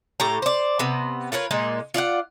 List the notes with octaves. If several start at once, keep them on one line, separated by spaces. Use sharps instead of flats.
A2 G4 A#5
C5 D5
C3 B3
F4 A#4 B4 C#5
A#2 G#3 D#4
F4 D5 D#5 F#5